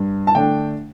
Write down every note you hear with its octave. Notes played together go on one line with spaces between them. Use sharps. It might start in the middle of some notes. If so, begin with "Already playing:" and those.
Already playing: G2
A5
D3 A3 D4 G5